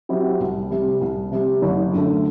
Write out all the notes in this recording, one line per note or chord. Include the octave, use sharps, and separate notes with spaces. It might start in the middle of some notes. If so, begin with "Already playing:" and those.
F#3 C4 E4 G4
C2
C3 G3
C2
C3 G3
F#1
F#2 D3 A3